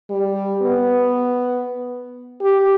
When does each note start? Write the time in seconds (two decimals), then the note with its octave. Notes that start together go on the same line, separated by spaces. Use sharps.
0.10 G3
0.62 B3
2.41 G4